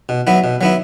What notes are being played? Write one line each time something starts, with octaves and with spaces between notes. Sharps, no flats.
B2
F#3 B3 E4
B2
F#3 B3 E4